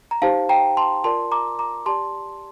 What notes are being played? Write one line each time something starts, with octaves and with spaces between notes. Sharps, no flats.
A#5
D#4 G4 C5 F5 A5
G5 A#5
A5 C6
F4 A#4 D5 A5 C6
A#5 D6
A#5 D6
G4 D5 A5 C6